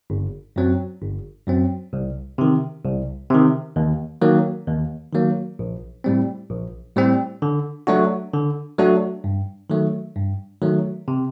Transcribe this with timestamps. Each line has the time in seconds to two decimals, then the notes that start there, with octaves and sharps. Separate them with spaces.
0.10 G1
0.56 F#2 F#3 C4
1.02 G1
1.47 F#2 F#3 C4
1.93 C2
2.38 C3 D#3
2.85 C2
3.30 C3 D#3
3.76 D#2
4.21 D#3 F#3 A#3
4.68 D#2
5.13 D#3 F#3 A#3
5.59 A#1
6.04 A2 G3 C4
6.51 A#1
6.96 A2 G3 C4
7.42 D3
7.87 F#3 A3 D4 F#4
8.33 D3
8.78 F#3 A3 D4 F#4
9.24 G2
9.70 D#3 F#3 A3
10.16 G2
10.62 D#3 F#3 A3
11.08 C3